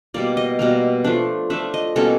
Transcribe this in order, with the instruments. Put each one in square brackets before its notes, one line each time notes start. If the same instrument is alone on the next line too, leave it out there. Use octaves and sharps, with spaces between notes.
[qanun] B2 G3 A#3 D5
D#5
B2 G3 A#3
F3 A3 D4
F3 A3 D4 E5
D#5
B2 G3 A#3 C#4 A4